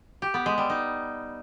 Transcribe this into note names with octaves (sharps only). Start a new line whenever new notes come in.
G4
B3
G#3
G3
D#4